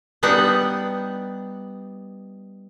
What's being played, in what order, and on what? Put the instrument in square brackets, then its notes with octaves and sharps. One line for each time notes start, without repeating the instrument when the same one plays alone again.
[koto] G3 B3 D4 D#4 F#5